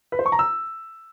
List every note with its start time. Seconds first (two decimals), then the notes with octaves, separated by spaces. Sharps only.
0.12 B4
0.19 C5
0.26 C#6
0.32 A#5
0.39 E6